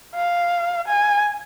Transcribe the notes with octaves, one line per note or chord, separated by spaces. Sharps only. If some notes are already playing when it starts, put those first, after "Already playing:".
F5
G#5